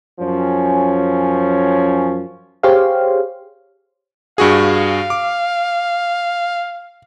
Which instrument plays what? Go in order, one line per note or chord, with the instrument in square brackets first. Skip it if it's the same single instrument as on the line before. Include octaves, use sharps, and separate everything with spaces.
[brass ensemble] F#2 F3 C#4
[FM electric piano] G4 G#4 C5 C#5 F5
[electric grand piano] G2 F#4 G#4 [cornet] F5
[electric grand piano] D6